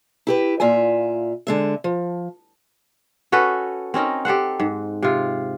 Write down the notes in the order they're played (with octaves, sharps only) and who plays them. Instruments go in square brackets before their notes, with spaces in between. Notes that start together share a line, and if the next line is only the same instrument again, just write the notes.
[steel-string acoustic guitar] E4 G4 B4
A#2 F4 E5 G#5
D3 G#3 E5
F3
[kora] C#4 F#4 A4 B4
C4 C#4 D#4 A#4
G4 A4 C5 F#5
G#2
C3 F4